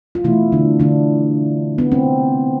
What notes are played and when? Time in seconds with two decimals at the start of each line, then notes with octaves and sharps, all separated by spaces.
0.15 F4
0.24 B2 E3 A3 E4
0.52 D3 D4
0.80 D3 D4
1.78 B3
1.92 C4